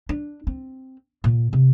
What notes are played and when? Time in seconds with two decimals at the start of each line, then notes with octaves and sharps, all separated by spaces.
0.09 D4
0.47 C4
1.24 A#2
1.53 C3